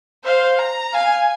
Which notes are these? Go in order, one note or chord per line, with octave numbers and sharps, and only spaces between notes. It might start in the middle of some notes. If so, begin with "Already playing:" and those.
C5 F5
A#5
F5 G#5